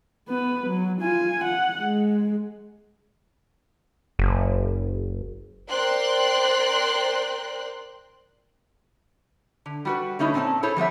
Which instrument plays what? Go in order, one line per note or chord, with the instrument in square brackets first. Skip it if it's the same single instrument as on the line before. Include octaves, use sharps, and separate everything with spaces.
[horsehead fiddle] B3 B4
F#3
F4 G#5
F#5
G#3
[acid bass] F#1
[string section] A#4 C5 D5 G5 C6 F#6
[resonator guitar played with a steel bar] D3
G3 F#4 B4
D3 A3 C#4 D#4 E4
A#2 C4 C#4 G#5 A5
E4 G#4 A4 C5 C#5
F3 G3 B3 E5